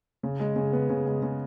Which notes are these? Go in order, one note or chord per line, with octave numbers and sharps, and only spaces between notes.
C#3
G#3
C#3
B3
C#3
G#3
C#3